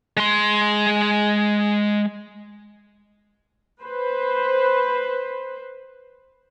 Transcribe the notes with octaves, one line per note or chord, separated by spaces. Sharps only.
G#3 C6
B4 C5